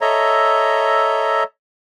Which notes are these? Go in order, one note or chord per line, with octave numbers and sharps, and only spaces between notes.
A4 C#5 D#5 E5 A#5